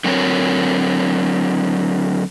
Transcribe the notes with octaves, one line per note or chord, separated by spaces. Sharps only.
D3 F#3 C4 A#4 C#5